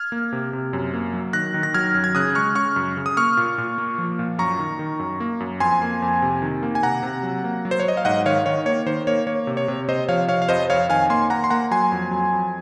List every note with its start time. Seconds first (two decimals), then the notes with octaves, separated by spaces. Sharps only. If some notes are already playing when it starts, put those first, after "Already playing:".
Already playing: F6 G#6
0.12 A#3
0.33 C3
0.53 C3
0.73 F#2
0.93 A#3
1.14 F#3
1.33 D#3 F#6 A#6
1.54 D#3
1.63 A#6
1.74 F#3 F6 G#6
1.95 F#2
2.04 G#6
2.15 C#3 D#6 F#6
2.35 G#3 C#6 F6
2.55 C#3 C#6 F6
2.76 F#2
2.97 C#3
3.06 D#6
3.17 A#3 C#6 F6
3.37 A#2
3.58 A#2
3.78 A#3
3.98 F3
4.19 A#2
4.38 F#2 A#5 C#6
4.59 D#3
4.79 D#3
4.99 F#2
5.20 A#3
5.40 F#2
5.60 F2 G#5 C6
5.82 A#3
6.02 F2
6.22 C3
6.42 D#3
6.63 A#3
6.75 G#5
6.82 C3 F#5 A#5
7.03 C3
7.23 F#3
7.44 A#3
7.65 F#3
7.71 C5
7.80 C#5
7.85 F#3 D#5
7.97 F5
8.05 G#2 D#5 F#5
8.26 D#3 C#5 F5
8.46 D#3 C#5
8.66 A#3 C#5
8.86 D#3 C5
9.07 A#3 C#5
9.27 A#3 C#5
9.47 C3
9.57 C#5
9.68 C3
9.88 C3 C5 D#5
10.08 F3 C#5 F5
10.29 C3 C#5 F5
10.42 F5
10.49 F2 C5 D#5
10.70 F2 C#5 F5
10.89 D#3 F5 G#5
11.10 A#3 G#5 C6
11.30 A#3 F#5 A#5
11.44 C6
11.50 A#3 F#5 A#5
11.71 F#3 G#5 C6
11.92 F2
12.11 F#3
12.33 F2